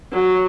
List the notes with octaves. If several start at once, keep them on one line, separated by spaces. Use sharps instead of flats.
F#3